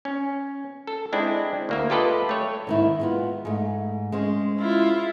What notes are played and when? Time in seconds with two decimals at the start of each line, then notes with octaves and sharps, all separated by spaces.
0.05 C#4
0.87 A4
1.13 G#3 C4 D4 E4
1.69 D2 A#3 E5
1.90 F4 G4 A4 B4 D#5 E5
2.29 A3 C#5
2.67 G#2 D#3 E4
3.00 G#3 B3 F4
3.45 G#2 A3
4.12 G#3 C#4 C5
4.59 E4 F4